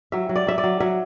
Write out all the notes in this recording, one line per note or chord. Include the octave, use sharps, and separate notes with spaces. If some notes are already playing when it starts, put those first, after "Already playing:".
F#3 E5
F#3
D5
F#3 E5
D5
F#3
F#3 E5